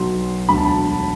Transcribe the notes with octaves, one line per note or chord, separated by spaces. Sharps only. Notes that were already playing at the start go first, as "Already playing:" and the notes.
Already playing: B1 B2 F#3 C6
E1 D2 D3 F#3 B5
A5
A5